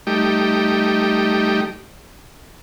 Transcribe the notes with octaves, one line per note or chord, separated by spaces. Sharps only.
G3 A3 D#4 G4